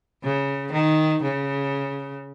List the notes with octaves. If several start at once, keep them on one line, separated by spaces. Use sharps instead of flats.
C#3
D#3
C#3